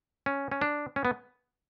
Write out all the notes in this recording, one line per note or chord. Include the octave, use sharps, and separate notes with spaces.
C#4
C#4
D4
C#4
B3